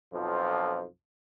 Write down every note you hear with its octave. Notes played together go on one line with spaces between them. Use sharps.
B1 F2 F3